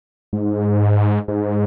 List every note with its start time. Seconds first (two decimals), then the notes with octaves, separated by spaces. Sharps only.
0.33 G#2
1.28 G#2